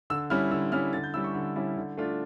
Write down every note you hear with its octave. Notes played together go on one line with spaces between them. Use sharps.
D3 E6
G3 C#4 E4 F6
D3 E6
G3 C#4 E4 F6
D3 A6
G6
G3 C#4 E4 E6
C#6
D3
G3 C#4 E4
D3
A3 D4 F4